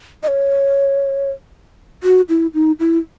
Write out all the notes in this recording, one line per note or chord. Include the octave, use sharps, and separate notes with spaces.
D#5
C#5
F#4
E4
D#4
E4